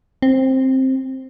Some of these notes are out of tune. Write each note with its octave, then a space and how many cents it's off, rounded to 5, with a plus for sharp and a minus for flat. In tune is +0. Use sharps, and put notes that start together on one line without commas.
C4 +10